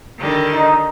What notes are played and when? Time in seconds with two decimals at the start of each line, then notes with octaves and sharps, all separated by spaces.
0.18 D3 D#3 G3
0.53 D#4